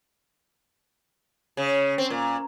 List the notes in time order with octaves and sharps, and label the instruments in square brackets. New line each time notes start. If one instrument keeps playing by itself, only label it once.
[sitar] C#3
C4
A#2